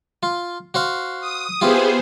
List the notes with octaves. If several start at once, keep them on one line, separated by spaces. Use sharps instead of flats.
F4
F#4 C5 F5
D#6
B3 E4 F4 G4 G#4 C5